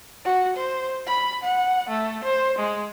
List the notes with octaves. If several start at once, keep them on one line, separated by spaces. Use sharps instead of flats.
F#4
C5
B5
F#5
A3
C5
G#3